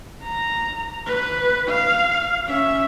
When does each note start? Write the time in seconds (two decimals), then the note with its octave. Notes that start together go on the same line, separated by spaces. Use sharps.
0.24 A#5
1.06 B4
1.69 F5
2.46 C#4 E5